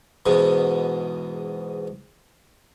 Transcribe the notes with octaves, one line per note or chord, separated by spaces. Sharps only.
E2 G#2 B2